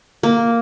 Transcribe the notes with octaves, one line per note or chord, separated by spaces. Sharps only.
A#3